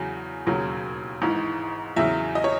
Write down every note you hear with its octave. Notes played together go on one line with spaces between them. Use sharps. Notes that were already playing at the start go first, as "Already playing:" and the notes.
Already playing: E2 C#3 F#3
E1 D#2 C#3 F#3
G#1 G#2 E3
E2 C#3 F#3 E5
D#5
C#5